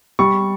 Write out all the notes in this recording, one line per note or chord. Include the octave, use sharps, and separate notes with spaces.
G3 C#6